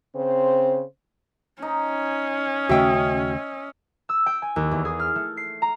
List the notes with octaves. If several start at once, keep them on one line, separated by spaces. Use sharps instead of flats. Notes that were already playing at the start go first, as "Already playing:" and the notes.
C#3 C4 C5
C#4 D#4
D#2 C#3 A3 F#4 D#5 E5 G5
E6
G5
G#5
D#2
E2
G#4
F6
A3
C7
A#5